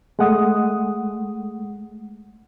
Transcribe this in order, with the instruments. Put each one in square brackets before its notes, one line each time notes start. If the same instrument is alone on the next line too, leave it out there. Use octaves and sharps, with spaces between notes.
[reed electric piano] G#3 A3 F#5 D#6